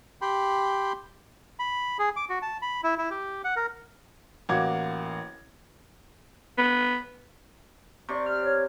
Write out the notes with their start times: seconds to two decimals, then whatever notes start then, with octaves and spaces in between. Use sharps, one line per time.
0.22 G4 G5 B5 C6
1.59 B5
1.99 G#4
2.16 D6
2.29 F#4
2.42 A5
2.62 B5
2.84 E4
2.98 E4
3.10 G4
3.44 F#5
3.56 A#4
4.49 A1 A#3 F#4 D6 G#6
6.58 B3
8.09 C3 D5 C#6
8.26 F6
8.43 C#5